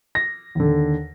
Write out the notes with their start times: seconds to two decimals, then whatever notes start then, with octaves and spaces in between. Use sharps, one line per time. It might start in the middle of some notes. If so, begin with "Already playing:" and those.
0.15 A#6
0.55 D#2 D3